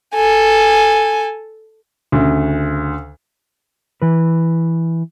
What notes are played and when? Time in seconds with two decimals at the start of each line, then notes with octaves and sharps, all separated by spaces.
0.14 A4 G#5
2.12 D2 C#3
4.02 E3 B4